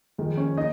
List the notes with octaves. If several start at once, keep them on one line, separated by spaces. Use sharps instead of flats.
F2 D#3 G#3
C#4 C#5
A#3 D#4 D#5